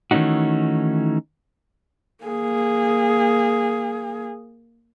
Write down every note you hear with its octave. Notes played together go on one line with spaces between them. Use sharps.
D#3 E3 A3 C#4 D#4 F#4
A#3 G#4